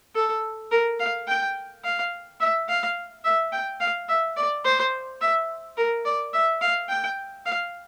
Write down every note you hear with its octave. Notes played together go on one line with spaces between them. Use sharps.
A4
A#4
F5
G5
F5
E5
F5
E5
G5
F5
E5
D5
C5
E5
A#4
D5
E5
F5
G5
F5